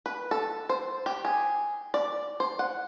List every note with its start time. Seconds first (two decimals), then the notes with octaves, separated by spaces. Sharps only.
0.06 B4
0.31 A4
0.69 C5
1.06 G4
1.25 G#4
1.94 D5
2.40 C5
2.59 F#5